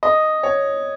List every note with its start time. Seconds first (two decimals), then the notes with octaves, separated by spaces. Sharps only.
0.03 D#5
0.43 C#5